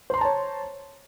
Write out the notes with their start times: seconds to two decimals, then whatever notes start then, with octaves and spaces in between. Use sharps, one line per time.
0.10 C5
0.14 C6
0.17 A#5
0.21 A5
0.25 C#5